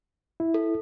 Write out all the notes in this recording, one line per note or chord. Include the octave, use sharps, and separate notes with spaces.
E4
A4